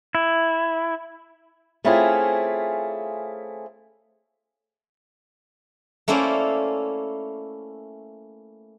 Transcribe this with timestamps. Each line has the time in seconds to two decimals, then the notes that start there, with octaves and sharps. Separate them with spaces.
0.15 E4
1.84 A3 C4 C#4 E4 F4 G#4
6.08 A3 A#3 C#4 E4 C5 D5